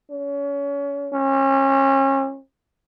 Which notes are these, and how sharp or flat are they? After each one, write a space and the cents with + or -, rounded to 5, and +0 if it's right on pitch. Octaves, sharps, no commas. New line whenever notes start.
C#4 +30
C#4 -35